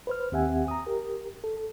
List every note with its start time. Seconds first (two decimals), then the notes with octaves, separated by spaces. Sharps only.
0.07 B4 C5 F6
0.32 D#2 C4 G4 E5 F#5 G#5
0.68 A#5 D#6
0.87 G4 A#4
1.44 A4